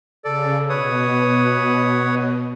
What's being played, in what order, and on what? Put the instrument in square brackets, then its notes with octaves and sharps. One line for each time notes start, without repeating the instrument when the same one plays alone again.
[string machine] C#3 [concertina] A4 D5
[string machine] B2 [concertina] B4 C#5 D#6